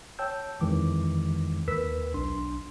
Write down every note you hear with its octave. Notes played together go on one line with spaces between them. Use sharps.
C#5 G5 A5 E6 G6
F2 D#3 E3 G#3 D6
D#2 A#4 B4 E6 B6
B1 D4 C6